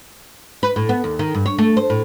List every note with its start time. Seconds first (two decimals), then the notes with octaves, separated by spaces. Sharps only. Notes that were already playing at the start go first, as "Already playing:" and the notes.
0.63 B4
0.76 A2
0.89 B3
1.04 D#2
1.19 D#3
1.34 G2
1.46 C#5
1.58 A3
1.77 C5
1.90 A2